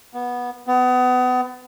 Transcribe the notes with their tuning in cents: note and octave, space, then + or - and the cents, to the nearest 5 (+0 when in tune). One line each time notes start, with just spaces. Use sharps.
B3 -15
B3 +30